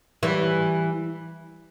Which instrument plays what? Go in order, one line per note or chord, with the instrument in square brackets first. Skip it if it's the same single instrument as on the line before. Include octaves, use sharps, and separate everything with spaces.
[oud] E3 G3